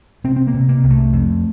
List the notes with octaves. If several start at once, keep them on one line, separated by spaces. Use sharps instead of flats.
C3 C4
C4
A#3
C3
A#3
C2
A3
F2